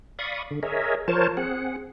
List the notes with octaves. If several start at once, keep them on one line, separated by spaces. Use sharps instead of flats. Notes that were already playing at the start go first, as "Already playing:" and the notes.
D5 F5 B5 C#6 D#6
D3
G#4 A#4 C#5 D#5 E5
F3 A#4 C5 C#5 A5
C4 G#4 F#5